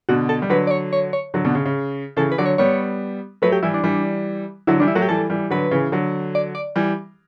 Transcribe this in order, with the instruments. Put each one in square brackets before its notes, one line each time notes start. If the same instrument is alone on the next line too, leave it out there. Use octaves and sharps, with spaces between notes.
[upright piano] B2 D3 [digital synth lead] F#4
[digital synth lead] A4
[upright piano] G3
[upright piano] D3 F#3 [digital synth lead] B4
[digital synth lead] D5
C#5
C#5
C#5
[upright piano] D3 F#3
B2 D3
C#3
C#3
[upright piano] C#3 E3 [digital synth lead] A4
[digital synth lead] B4
[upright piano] D3 F#3 [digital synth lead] D5
[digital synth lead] C#5
[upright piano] G3 B3 [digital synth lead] C#5
[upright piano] F#3 A3 [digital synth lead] B4
[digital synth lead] G4
[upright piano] E3 G3 [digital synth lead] E4
[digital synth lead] D4
[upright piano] E3 G3
[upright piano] D3 F#3 [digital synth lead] E4
[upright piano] E3 G3 [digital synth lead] D4
[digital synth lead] E4
[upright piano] F#3 A3 [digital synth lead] F#4
[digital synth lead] G4
[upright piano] E3 G3 [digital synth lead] A4
[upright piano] E3 G3
[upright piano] D3 F#3 [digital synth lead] B4
[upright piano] C#3 E3
D3 F#3
[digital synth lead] D5
D5
[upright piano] E3 G3